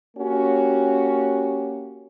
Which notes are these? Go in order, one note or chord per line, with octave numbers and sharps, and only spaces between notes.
A#3 C#4 F#4 G4